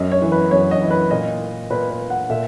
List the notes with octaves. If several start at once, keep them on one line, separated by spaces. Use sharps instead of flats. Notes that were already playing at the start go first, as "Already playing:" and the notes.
Already playing: F#2 D#5
C#5
E3
B4
F#2 C#5
D#5
E3
B4
A#2 D#5
A#2 B4
B4
F#5
A#2 E5